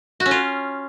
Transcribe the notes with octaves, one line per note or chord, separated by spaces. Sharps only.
F#4
C#4
F4